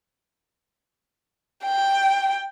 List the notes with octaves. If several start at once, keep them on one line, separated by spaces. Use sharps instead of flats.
G5